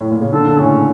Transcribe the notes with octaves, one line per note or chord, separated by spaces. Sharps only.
A2
A#2
C#3
A#2 D3 A4
D3
A2 C#3 C#4